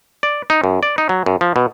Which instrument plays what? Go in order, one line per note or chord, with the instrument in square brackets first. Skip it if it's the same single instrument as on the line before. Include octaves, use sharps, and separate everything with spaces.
[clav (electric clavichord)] D5
D#4
F#2
D5
D#4
F#3
F#2
F3
B2